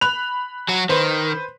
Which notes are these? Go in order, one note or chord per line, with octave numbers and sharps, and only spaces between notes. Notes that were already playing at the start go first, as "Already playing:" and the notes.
B5 F#6 F7
F#3 F#4
D#3 B4 C5